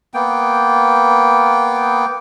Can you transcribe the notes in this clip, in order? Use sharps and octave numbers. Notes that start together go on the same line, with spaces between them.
A#3 B3 G5